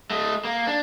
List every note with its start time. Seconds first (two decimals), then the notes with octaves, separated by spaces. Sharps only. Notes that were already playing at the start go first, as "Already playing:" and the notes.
0.10 A3 D#5
0.45 A#3
0.67 D4